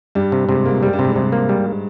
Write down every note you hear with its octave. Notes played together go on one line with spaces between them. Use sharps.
G2 G3
C3
G#2 C3
G#2 A#3
A#2
G#2 G3
G2
C3
G#2
G2 C3
A#3
G3